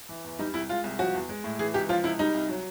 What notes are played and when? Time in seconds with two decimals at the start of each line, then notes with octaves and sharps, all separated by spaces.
0.09 E3
0.24 E2
0.39 G3 D#4
0.54 C2 E4
0.69 G#3 F4
0.84 C2
0.99 F3 F#4
1.14 E2
1.29 G#3
1.44 A2
1.59 E3 G#4
1.74 C#2 G4
1.89 F3 F4
2.04 C#2 E4
2.19 G3 D#4
2.34 C2
2.49 F#3